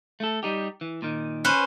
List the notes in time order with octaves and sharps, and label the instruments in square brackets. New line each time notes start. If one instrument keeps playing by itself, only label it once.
[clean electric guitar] A3 A4
G3 D#4 G4
E3
A#2 D#3
[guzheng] C#4 B4 C5